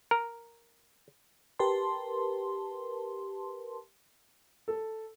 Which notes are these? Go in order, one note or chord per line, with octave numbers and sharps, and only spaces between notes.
A#4
G4 A#4 B4 A5 C6
A4